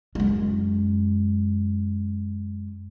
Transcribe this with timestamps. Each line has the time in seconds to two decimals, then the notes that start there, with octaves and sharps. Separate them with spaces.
0.15 F#2 G#3